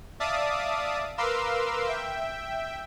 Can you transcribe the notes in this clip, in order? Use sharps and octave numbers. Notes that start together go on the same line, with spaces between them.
D5 E5 F5 A5 D6 D#6
A#4 B4 F5 C6 D6 E6
E5 G5